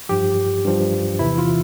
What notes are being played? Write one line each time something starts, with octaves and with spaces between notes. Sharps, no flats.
G2 F3 G4
G2 F3
E2 C3 E3 E4
F4